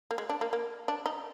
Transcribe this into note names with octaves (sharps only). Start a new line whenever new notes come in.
A#3
G#3
D4
A#3
A#3
D4
D#4